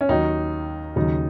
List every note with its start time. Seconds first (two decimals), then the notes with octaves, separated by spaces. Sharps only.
0.01 C#4
0.09 D#2 D#3 F#3 D#4
0.96 D#2 C#3 F#3 D#4